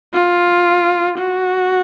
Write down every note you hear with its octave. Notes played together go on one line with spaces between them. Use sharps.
F4
F#4